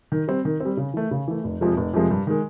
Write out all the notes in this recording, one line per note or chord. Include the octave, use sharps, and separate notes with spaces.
D#3
G3 C4
D#3
G3 C4
C#3
E3 A3
C#3
E3 A3
F1
F2 C3 F3 G#3
F1
F2 C3 F3 G#3
G2
D#3 G#3